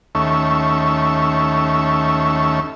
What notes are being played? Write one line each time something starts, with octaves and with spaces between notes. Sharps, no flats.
D#2 A3 C#4 E5